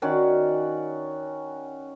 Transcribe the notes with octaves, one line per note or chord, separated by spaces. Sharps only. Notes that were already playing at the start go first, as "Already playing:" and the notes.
D#3 C#4 F#4 D5